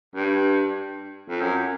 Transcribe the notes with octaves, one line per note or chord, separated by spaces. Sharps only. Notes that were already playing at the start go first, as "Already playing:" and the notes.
G2
F2
F#2